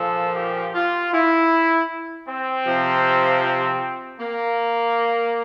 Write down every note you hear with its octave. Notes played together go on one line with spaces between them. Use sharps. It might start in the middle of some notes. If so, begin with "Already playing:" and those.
Already playing: A#2 F3 A4
G4
F4
E4
C4
C3 F3
A#3